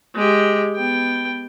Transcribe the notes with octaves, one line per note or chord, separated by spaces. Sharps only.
G#3 G4
B3 G5